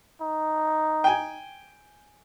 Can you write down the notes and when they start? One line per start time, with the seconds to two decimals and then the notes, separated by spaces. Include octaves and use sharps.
0.22 D#4
1.04 G5 G#5